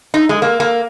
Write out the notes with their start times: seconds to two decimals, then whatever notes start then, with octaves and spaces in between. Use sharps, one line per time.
0.14 D#4
0.29 G#3
0.42 A#3
0.60 A#3